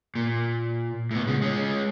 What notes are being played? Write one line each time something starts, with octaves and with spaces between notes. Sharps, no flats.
A#2
A2 B3
C#3 G#3
G#3 C#4